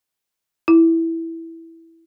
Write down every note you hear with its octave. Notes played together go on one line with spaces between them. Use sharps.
E4